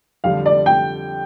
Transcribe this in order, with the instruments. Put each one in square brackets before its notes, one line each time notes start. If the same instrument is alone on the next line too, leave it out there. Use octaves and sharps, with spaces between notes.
[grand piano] F2 D3 G3 [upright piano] F5
[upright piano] D5
G5